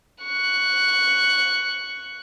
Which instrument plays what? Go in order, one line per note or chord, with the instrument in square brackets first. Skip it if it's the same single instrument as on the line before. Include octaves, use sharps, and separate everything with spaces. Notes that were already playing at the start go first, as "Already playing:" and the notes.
[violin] C#6 F#6